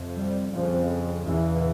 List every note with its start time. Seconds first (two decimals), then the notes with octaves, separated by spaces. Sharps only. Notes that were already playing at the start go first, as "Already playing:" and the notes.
Already playing: F2 C3
0.17 G3
0.52 F2 C#3 F3
1.25 E2 C#3 E3